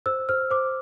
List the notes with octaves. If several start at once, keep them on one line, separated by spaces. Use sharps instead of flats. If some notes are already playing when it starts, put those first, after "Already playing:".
C5 E6
C5 F6
C5 D6